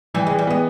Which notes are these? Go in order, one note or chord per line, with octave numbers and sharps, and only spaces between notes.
E3 G3
G#3
E3
G3
G#3 B3